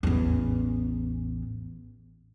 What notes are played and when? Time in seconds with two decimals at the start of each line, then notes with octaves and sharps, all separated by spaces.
0.03 A1 E2